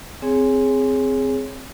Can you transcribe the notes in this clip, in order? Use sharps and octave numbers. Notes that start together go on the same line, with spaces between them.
C4 G#4 C#5 G#5